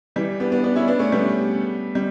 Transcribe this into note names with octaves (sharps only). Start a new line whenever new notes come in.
E3 G3
B3 D4
B3 D4
B3 D4
C#4 E4
B3 D4
A3 C#4
G3 B3
G3